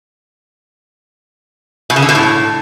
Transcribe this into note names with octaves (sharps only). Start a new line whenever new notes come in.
B2
C#3
D3
B2
A2